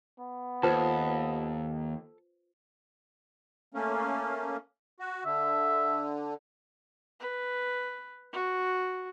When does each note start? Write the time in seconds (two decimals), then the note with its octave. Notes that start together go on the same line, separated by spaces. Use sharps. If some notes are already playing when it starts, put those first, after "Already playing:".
0.19 B3
0.63 D#2 F4 A4 B4 C5 A5
3.74 A3 A#3 C#4
5.00 F#4
5.25 D3 E5
7.20 B4
8.32 F#4